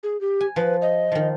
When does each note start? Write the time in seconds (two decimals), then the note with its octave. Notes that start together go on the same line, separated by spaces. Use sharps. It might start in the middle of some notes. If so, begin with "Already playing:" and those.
0.03 G#4
0.21 G4
0.41 G#5
0.56 F3 B4
0.82 D#5
1.12 D#3 F3